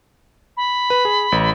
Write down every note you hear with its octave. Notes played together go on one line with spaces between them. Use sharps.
B5
B4
G#4
A1